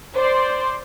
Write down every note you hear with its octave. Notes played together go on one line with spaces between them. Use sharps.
C5 D5 C6